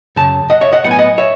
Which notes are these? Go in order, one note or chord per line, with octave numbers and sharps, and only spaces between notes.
F#2 C#3 A5
D#5 F#5
C#5 E5
D#5 F#5
A2 F#3 B3 F#5
G#5
D#5 F#5
C#5 E5